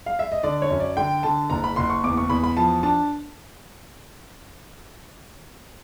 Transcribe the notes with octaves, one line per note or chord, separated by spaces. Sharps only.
F5
E5
D#5
D3 D5
C#5
F#2
D5
D3 G5
D3 A5
F#1 A#5
B5
F#1 C6
C#6
E2 D6
C#6
E2 B5
B5
F3 A5
D4 A5